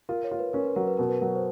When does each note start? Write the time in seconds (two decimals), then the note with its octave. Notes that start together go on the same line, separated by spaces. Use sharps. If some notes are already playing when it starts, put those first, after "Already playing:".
0.09 F4 A#4
0.24 C#5
0.31 F4
0.39 B4
0.53 C#4 A#4
0.64 B4
0.75 F#3 A#4
0.87 B4
0.97 B2 A#4
1.09 B4
1.20 F#3 A#4
1.35 C5